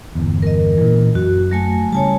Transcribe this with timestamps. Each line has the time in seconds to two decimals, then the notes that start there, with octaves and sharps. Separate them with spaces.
0.15 G1 E2
0.42 A#4 D#5
0.77 A#2 E3
1.15 F#2 F#4
1.51 F#3 A3 G#5
1.92 C#3 G3 C#5 G#5 A5